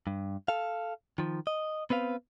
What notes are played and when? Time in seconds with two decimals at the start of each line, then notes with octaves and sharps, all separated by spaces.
0.07 G2
0.48 A4 F5
1.18 D#3 F3
1.47 D#5
1.90 B3 C4 B4 F5